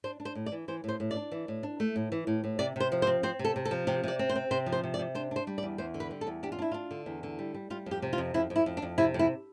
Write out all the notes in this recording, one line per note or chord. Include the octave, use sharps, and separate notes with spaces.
D4 C5
D4
C5
A2
D5
E3
E3 C5
A2 C5
A2
D5
D4
E3
A2
D4
A3
A2
E3
A2
A2
C3 D5
C3 C5
F3
C5
C4
C4 C5
C3
A4
C3
A4
F3
C3 G4
C3 D5
C4
C5
C4
C3 C5
F3
C5
C3
D5
C3
D4 C5
D4 C5
G3
D5
E2
E2 C5
D3
B4
G3
A4
E2
D4 G4
F4
D4 E4
D4 F4
D3
E2
D3
G3
G3
G3 F4
F2 G4
C3
F4
F2
F2 E4
F2
E4
F2
D4
F2
C3 E4
F2
E4